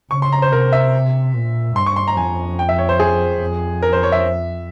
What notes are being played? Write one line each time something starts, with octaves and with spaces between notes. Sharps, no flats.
C#3 C#6
C6
A#5
C5
C3 A#4
E5
A#2
G2 C6
C#6
C6
A#5
F2 G#5
G5
E5
C#5
C5
G#4
F2
A#4
C5
C#5
E5